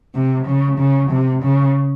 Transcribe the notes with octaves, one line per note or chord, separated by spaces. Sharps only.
C3
C#3
C#3
C3
C#3